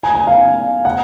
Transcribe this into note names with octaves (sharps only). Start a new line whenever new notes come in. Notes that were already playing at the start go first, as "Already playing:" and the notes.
G#5
G#5
F5
F#5